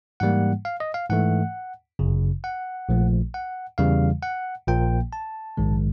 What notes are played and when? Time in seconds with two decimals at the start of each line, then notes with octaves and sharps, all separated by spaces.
0.20 G#2 E3 G3 A#3 F#5
0.65 F5
0.80 D#5
0.94 F5
1.09 G#2 E3 A3 F#5
1.99 G1 F#2 C#3
2.44 F#5
2.89 A#1 A#2 F3 A3
3.34 F#5
3.78 E2 C#3 E3 G3 F5
4.23 F#5
4.67 A#1 A#2 F3 A#3 G5
5.13 A5
5.57 A#1 G#2 D#3 G#3